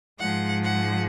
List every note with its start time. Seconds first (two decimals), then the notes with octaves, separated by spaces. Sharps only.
0.20 G#2 F3 G#3 F#5
0.65 F#5